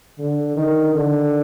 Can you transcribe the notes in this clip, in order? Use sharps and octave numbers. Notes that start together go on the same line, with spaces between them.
D3
D#3
D3